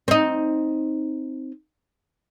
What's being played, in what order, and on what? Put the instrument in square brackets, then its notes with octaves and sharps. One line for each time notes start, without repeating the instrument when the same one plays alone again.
[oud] C4 D#4